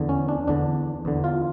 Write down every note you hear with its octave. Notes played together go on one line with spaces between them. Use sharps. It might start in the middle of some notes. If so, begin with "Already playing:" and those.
Already playing: E2 D3
C#4
D4
E2 D3 D4
E2 D3
F4